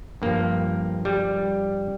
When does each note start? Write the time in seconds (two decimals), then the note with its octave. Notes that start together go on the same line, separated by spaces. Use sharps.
0.22 G2 F3 A#3
1.05 G3